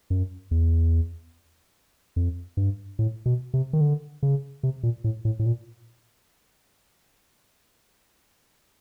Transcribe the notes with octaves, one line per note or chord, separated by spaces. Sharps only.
F#2
E2
F2
G2
A2
B2
C3
D#3
D3
C#3
C3
A#2
A2
A2
A2
A#2